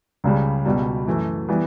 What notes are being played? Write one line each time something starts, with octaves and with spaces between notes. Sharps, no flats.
C#2 C#3 G3
C#2 B2 G3
F#2 E3 A3
E3 G3 B3